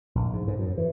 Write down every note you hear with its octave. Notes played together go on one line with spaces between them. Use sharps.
A#1
G#2
G#2
F#2
E3